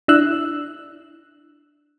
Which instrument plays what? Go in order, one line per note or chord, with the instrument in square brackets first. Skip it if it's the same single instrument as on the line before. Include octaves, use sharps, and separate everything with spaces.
[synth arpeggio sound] D4 E4 E6 F#6